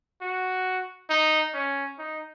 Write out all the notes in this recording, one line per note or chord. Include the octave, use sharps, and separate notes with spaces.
F#4
D#4
C#4
D#4